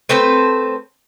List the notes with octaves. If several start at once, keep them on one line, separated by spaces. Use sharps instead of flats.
A3 C4 B4 C5